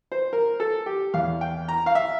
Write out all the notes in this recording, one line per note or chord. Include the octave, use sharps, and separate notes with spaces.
C5
A#4
A4
G4
E2 E3 F5
G5
A#5
F5
E5